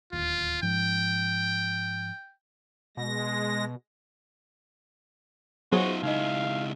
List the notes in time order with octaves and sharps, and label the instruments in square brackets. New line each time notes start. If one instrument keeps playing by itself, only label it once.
[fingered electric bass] D1 D#2 [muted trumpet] F4
[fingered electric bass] G#2 F3 [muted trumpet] G5
[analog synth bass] B2 [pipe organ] G#3 A#6
[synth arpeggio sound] F#3 B3 G#4 [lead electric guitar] D#4 F4 [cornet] F#4 [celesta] C5 F#5
[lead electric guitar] C#2 E4 [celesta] D#4 D#5 [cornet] F5